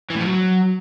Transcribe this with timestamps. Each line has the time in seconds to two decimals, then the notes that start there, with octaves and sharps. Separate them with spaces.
0.10 E3
0.15 A2
0.20 F3
0.25 F#3